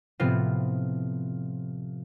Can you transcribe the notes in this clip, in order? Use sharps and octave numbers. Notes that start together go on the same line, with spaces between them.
A2 C3 F3 B3 C4 F4